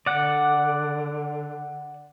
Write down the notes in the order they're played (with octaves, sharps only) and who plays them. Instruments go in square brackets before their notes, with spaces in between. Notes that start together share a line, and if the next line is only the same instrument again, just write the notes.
[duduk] D3 [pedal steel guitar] D5 F#5